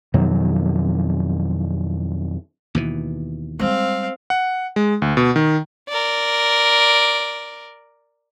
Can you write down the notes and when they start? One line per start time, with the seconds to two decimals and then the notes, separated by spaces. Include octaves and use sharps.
0.14 F2 B2 D#3 F#3
2.75 D#2 B2 E3
3.59 G3 G#3 C4 F5
4.30 F#5
4.76 G#3
5.02 D2
5.17 B2
5.36 D#3
5.89 A#4 D5